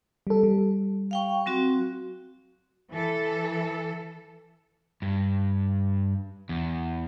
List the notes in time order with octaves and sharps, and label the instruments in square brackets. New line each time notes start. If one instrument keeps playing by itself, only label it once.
[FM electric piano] G3 A4
G3
[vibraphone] F5 G5 C#6
F#3 C4 F#4
[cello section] E3 A4
[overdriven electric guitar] G2
E2